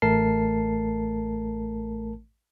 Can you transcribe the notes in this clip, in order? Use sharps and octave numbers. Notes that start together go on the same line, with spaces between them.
A1 A3 A#4 A5 C7